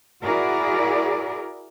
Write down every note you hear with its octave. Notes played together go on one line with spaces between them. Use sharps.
E4 F#4 G#4 A#4 D5